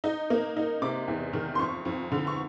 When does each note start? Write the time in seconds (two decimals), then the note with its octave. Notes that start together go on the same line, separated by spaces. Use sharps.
0.04 D#4
0.30 A#3
0.57 D#4
0.82 C3 D6
1.07 E2
1.33 D#3
1.55 C6
1.59 F2 C#6
1.85 F2
2.12 D3
2.27 C#6